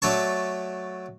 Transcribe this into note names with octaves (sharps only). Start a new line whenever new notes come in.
F#3 A3 A4 D5 A5 C#6